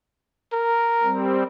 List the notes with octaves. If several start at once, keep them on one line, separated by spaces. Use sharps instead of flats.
A#4
G3 C4